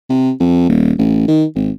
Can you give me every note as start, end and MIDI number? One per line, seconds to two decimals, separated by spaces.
0.10 0.32 48
0.40 0.65 41
0.69 0.92 27
0.99 1.27 33
1.28 1.45 51
1.55 1.71 32